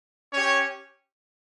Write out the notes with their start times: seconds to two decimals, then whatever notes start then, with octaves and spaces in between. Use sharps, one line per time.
0.32 C#4 G4 C#5